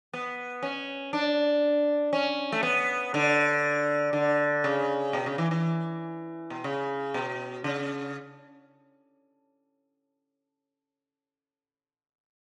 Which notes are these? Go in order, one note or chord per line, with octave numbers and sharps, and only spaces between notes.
B3
C#4
D4
C#4
A3
B3
D3
D3
C#3
B2
C#3
E3
E3
B2
C#3
B2
C#3